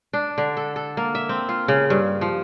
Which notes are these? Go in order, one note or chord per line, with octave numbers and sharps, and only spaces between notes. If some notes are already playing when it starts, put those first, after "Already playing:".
D4
D3
A4
A4
A#3
E5
C4
F4
C#3
G2
F3